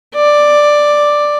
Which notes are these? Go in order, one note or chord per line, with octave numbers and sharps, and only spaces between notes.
D5